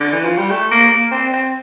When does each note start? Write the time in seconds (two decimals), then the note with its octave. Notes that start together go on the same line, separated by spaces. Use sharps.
0.00 D3
0.13 E3
0.25 F3
0.38 G3
0.51 A3
0.71 A#3
0.91 A#3
1.12 C4
1.32 C4